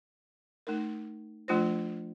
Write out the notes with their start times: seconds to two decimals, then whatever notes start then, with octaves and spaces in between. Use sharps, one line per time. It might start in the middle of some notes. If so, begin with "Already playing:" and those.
0.67 A3 D#4 A#4
1.48 F3 A3 D4 F4 C5